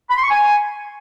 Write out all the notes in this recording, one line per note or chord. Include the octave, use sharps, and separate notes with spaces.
B5
C6
C#6
G#5